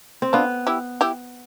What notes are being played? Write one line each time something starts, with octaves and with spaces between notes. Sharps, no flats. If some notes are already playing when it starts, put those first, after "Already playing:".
C4
B3 D4 F4
E4 G4
E4 G4